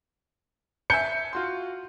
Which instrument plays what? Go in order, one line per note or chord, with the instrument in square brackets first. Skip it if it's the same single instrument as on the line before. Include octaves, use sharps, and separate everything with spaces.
[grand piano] E5 G#5 A5 [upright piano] G6 C#7
[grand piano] F4 F#4 C6